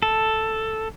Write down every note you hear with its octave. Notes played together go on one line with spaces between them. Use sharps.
A4